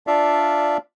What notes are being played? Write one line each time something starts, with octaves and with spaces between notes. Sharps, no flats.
D4 F4 D5 E5 F5